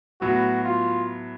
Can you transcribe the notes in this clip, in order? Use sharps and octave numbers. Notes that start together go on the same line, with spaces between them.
A2 F#3 B3 F#4
F4